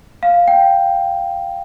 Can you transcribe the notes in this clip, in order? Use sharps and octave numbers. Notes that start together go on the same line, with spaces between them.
F5
G5